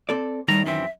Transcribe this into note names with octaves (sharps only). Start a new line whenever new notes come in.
C4 A4 D5
D#2 A2 D#3 G3 A#5
F#2 E3 C4 E5